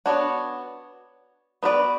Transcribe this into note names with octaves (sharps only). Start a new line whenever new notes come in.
B3 D4 F#4 C#5
B3 F#4 B4 D5